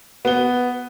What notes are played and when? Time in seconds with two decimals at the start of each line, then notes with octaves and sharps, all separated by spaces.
0.25 B3 G7